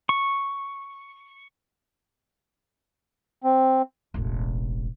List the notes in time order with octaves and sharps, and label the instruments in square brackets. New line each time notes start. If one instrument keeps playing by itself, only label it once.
[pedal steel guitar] C#6
[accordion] C4
[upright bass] E1 A1